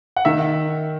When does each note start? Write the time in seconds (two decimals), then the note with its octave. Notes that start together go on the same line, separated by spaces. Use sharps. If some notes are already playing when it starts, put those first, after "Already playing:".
0.16 F#5
0.25 D#3 E5